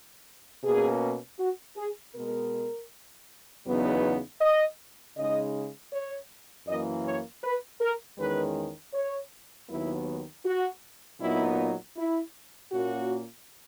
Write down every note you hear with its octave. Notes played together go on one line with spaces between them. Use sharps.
B2 A#3 C#4 G#4
F#4
G#4
B2 G#3 B3 A#4
E2 C#3 F#3 B3 D#4
D#5
C#3 G#3 D#4 D#5
C#5
F#2 E3 A#3 D#5
C#5
B4
A#4
E2 D#3 G#3 C#4 B4
C#5
D#2 D#3 F#3 B3 E4
F#4
A#2 F#3 B3 D#4 E4
E4
A#2 A#3 C#4 F#4